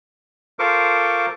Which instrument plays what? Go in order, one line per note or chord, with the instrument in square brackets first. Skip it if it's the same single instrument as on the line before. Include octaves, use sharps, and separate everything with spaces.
[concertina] F4 A4 A#4 C5 C#6 D6